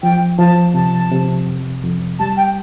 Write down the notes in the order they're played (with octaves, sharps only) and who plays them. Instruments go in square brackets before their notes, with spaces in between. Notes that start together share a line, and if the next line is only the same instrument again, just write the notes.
[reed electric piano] F3 [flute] G5
[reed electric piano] F3 [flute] A5
[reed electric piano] C3 [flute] A5
[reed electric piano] C3
F2
F2
[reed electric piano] G3 [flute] A5
[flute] G5